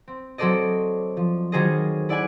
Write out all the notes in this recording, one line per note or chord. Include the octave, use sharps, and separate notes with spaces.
C4
F#3 C4 A4 C5 D5 D#5
F3
D#3 F#3 G3 G#4 C5 D#5
E4 D5 F#5 G#5